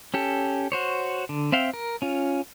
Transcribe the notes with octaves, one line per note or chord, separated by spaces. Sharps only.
C#4 G4 A4
F#4 C5 C#5
D3
C4 E5 F5 G5
A#4
C#4 F4